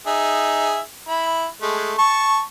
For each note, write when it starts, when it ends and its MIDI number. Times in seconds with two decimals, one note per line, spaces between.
0.07 0.79 63
0.07 0.79 68
0.07 0.79 76
1.08 1.46 64
1.08 1.46 83
1.62 1.94 56
1.62 1.94 57
1.99 2.41 81
1.99 2.41 85